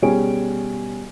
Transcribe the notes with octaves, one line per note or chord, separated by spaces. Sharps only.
B2 G3 C#4 G#4 G#5 D7